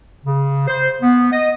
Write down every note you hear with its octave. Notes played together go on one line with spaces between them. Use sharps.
C#3
C5
B3
D#5